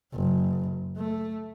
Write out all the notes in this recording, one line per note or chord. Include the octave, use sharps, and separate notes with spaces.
F#1
A3